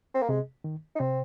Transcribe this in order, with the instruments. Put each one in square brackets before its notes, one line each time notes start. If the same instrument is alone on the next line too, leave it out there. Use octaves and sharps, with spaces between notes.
[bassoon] C4
A#3
[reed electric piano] C3 [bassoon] G#3
[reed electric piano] D#3
[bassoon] D#4
[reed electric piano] C3 [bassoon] C4